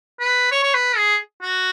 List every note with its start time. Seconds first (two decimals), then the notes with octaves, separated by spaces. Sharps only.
0.20 B4
0.51 C#5
0.63 C#5
0.74 B4
0.97 G#4
1.42 F#4